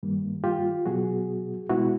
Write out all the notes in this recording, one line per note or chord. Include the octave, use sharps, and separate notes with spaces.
G2 D#3 G3 A#3
F4 G4
B2 F#3 B3 F#4 G#4
B2 G#3 B3 E4 F#4